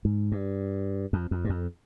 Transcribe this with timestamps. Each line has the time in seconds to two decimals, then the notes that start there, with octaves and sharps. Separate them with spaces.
0.05 G#2
0.32 G2
1.13 F2
1.31 F2
1.45 G2
1.50 F2